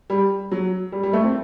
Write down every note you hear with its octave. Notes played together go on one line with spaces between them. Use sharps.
G3
F#3
G3
G3
A3
C4